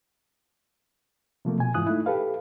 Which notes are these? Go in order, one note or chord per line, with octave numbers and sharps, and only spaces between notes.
C3 F3 A3 A#3
B2 G#5
G#2 E3 E4 F4 D#6 F#6
A3 D#4 E4
G4 A4 B4 F5